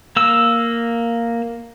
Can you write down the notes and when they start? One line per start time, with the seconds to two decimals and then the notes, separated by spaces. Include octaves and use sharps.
0.16 A#3 E6